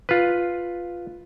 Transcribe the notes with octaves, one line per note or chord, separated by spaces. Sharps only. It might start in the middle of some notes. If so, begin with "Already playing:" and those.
F4 B4